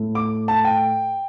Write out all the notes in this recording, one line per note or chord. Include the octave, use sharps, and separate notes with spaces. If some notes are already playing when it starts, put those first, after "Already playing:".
Already playing: A2 A3
D6
A5
G5